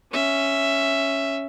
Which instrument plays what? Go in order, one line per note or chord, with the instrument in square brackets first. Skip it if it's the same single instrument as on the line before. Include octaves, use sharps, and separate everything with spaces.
[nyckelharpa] C#4 E5